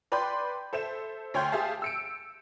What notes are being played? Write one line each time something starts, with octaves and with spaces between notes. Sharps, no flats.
B4 D5 G5 B5 C6 G6
A4 C5 E5 E7
D2 C#5 G5 C6 G6
G4 G#4 E5 F5 A5
E6 C#7 D7